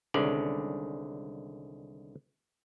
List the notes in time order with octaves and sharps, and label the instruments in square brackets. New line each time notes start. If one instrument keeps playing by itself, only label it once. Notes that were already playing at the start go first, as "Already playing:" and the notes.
[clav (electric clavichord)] C2 D3 D#3 G#3 C#4 D5